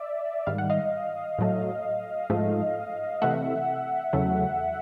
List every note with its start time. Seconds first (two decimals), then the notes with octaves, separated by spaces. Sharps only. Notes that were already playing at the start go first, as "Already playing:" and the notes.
Already playing: D5 E5
0.47 G#2 D#3 G3 F5
0.58 F#5
0.70 D#5 F5
1.39 A2 F#3 A3
2.30 G#2 F3 A3
3.22 C3 E3 A3 E5 F#5
4.13 E2 C#3 F#3 A3